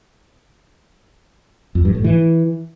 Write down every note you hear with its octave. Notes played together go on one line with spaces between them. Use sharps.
F2
G2
A2
E3